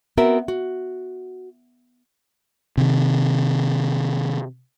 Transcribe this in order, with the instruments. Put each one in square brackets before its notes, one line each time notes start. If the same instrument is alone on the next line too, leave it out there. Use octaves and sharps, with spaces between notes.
[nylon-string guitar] B3 C4 F#4 A#4 B4 E5
F#4
[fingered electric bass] C3 D#3